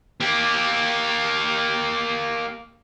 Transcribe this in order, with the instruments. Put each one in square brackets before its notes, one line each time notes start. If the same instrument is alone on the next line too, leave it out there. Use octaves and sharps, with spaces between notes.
[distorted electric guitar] A#3 G4